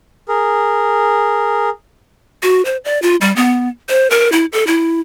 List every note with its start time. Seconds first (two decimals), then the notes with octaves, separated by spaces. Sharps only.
0.28 G#4 A#4
2.43 F#4
2.65 C5
2.85 D5
3.02 F4
3.21 G3
3.36 B3
3.89 C5
4.10 A#4
4.32 E4
4.52 A4
4.67 E4